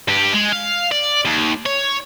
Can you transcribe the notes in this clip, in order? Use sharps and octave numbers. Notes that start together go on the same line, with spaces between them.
G2 G4
G#3
F5
D5
D#2
C#5